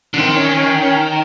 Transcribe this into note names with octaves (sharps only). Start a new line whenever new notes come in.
D3
D#3 C4
C#4
C#4
C#4